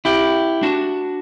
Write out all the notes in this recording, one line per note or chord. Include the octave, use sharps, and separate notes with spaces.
E4 G4
D4 F#4